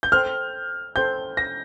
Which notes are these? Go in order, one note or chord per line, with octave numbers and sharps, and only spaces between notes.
G6
A4 C5 G5 F6
A4 C5 G5 G6
A#6